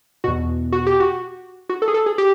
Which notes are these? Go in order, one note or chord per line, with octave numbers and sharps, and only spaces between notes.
E2 B2 F#4
F#4
G4
F#4
F#4
A4
G#4
A4
G#4
G4